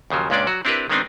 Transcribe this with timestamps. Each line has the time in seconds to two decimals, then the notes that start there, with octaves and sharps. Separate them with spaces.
0.10 D#2 C#3 F3 F#3
0.30 C#2 A#2 G#3 C#4 D4 D5
0.47 F#3 F#4
0.65 C4 D4 E4 G4 A#4 B4
0.90 D#3 G#3 B3 C4 D4 D#4